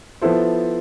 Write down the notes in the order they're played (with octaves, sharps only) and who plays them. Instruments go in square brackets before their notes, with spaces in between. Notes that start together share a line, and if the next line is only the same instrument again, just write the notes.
[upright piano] F3 B3 E4 A4 C5